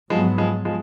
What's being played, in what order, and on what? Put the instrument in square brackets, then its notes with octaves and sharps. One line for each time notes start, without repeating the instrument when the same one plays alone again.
[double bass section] G#2 F#3 B3 [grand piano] F3 G#3
[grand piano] F3 G#3
F3 G#3